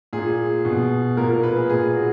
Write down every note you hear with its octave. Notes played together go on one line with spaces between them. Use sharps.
A#2 G#4
B2
A#2 A#4
A#4
B4
G#4
A#2 G#4
F#4